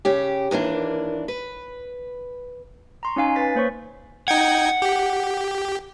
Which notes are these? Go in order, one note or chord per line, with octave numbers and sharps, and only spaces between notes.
C#3 C#4 G4
D#2 E3 A#3 D4
B4
A#5 C6 C#6
C#4 D#4 F5 G#5
B4 A6 B6
A#3 C5 C#5 C#6 B6
D#4 F#5 G5 G#6
G4